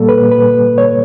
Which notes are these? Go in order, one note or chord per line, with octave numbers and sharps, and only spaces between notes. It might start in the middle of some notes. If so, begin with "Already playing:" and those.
Already playing: A#2 G3 A#3 A4
B4
B4
C#5